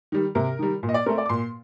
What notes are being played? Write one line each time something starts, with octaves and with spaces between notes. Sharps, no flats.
D#3 G3
C3 A#4
D#3 G3
A#2
D#5
D5
A3 C4 A#4
D5
D6
A#2 C6